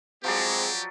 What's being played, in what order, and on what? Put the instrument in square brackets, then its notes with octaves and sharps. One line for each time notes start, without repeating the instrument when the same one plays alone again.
[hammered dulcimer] F3 F#3 D5 [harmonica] G#3 C4 G#4 [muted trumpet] G4